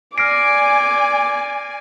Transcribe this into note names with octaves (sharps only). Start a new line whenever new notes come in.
D5 G#5 D6 F6 A#6 C7 D7